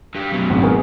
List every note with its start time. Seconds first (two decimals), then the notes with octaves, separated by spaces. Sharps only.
0.15 G2 G3
0.32 F#2 B2
0.50 G#1 C#3
0.63 G#4 A#4 B4